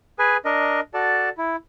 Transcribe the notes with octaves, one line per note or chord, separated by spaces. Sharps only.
G#4 B4 G#5
D4 A#4 D#5
F#4 A4 D5 A5
E4